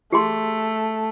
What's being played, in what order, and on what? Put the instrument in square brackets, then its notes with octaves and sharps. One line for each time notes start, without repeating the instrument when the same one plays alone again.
[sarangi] A3 [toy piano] G4 G#4 C6